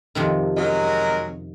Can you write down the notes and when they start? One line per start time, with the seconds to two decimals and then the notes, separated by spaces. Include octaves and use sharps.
0.15 F2 C3 D#3
0.57 F#3 G#3 A#4